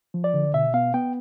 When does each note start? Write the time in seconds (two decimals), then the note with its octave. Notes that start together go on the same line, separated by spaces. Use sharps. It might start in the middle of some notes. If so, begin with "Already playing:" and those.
0.14 F3
0.24 D5
0.34 D3
0.54 B2 E5
0.74 B3 F5
0.94 B3 G5